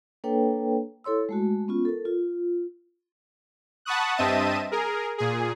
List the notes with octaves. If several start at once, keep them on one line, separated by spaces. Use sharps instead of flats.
A#3 D4 A4 B4 C#5 G5
E4 A4 C#5 C6 E6
G#3 A3 F#4
B3 C#4 F4
A4 A#4
F4
F#5 A5 B5 C#6 D#6 F#6
G2 C4 D#5 E5 A5 D#7
G#4 A#4
A#2 G#4